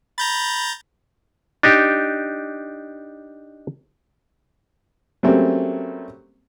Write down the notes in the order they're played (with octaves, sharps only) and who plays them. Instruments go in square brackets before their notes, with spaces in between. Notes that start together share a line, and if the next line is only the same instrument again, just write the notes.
[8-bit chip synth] A#5 G6 A6 [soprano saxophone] B5
[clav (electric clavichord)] D4 D#4 G4
[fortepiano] F#3 G3 A3 A#3 C4 C#4